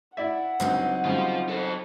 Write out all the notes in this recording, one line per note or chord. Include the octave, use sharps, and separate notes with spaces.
E4 D5 E5 F#5
C#2 G2 F#3 C4 D#4
C#3 G3 F4 C5
A4 C5